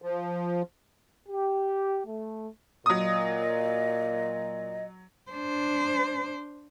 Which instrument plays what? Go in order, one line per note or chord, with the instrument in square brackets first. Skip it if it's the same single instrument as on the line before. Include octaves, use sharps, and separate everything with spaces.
[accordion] F3
[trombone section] G4
A3
[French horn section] A#2 [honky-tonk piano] F#3 D#6 [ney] D#5
[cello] D4 C5